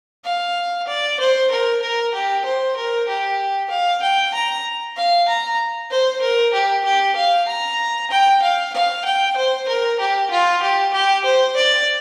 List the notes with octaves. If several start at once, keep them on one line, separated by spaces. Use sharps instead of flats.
F5
D5
C5
A#4
A#4
G4
C5
A#4
G4
F5
G5
A#5
F5
A#5
C5
A#4
G4
G4
F5
A#5
G5
F5
F5
G5
C5
A#4
G4
F4
G4
G4
C5
D5